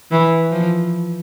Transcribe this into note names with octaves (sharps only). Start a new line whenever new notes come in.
E3
F3